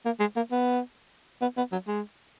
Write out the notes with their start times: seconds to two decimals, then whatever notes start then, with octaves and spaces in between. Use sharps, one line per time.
0.06 A#3
0.20 G#3
0.36 A#3
0.52 B3
1.42 B3
1.58 B3
1.72 F#3
1.88 G#3